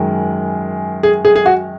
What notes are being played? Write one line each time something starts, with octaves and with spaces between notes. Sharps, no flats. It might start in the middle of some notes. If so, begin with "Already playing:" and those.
Already playing: F#2 D#3 G#3
G#4
G#4
G#4
F#4